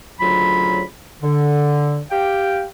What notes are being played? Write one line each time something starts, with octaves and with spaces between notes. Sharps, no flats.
D2 C#3 F#3 F4 B5
D3
G4 F5 G5